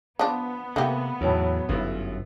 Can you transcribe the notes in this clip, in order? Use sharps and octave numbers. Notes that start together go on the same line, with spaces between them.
F3 B3 D4
C3 A3 A#3 G4
E2 A2 F#3
G1 F#2 B3 E4